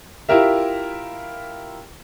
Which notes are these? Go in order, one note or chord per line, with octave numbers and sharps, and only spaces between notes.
E4 F4 G4 A#4 E5